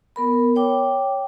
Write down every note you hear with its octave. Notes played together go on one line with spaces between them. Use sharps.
B3 A#4 B5
C#5 G5 D6